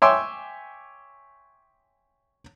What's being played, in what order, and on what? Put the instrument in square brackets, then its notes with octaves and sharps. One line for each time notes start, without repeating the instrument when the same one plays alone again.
[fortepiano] C#5 E5 G5 G#5 C6 D6